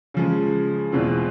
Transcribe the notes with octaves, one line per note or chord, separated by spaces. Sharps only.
C#3 F3 G#3
E2 B2 G#3 C4 F4